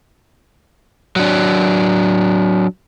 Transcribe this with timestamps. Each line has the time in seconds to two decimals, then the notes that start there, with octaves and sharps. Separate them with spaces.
1.16 F#3 D4